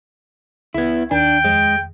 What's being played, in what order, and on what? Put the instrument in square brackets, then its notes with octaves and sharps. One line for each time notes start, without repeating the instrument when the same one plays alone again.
[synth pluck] C#2 G#6 [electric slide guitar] B3 E4
[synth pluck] D#2 D#3 [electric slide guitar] D4 [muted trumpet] G5
[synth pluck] F2 [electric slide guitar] G#3